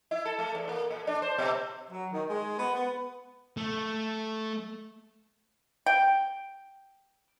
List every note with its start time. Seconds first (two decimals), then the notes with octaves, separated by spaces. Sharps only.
0.11 E4
0.25 A4
0.39 A3
0.55 E2
0.69 A#3
0.90 A#2
1.07 D4
1.22 C5
1.38 B2
1.90 F#3
2.11 D#3
2.29 G#3
2.58 B3
2.73 B3
3.57 A3
5.86 G5